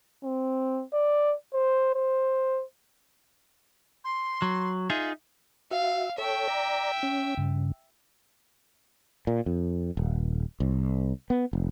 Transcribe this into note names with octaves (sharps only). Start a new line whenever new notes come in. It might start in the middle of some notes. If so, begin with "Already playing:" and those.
C4
D5
C5
C5
C6
F#3
D#4 F4 G#4 E5
F#4 E5 F5
A4 C#5 E5 G5
D5 A#5
C#4
G2 C#3
A#2
F2
D#1
C2
B3
F1